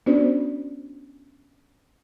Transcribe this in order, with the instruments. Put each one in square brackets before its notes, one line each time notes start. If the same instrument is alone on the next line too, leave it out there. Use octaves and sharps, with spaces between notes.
[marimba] B3 C#4 D4 F#4 C5 D5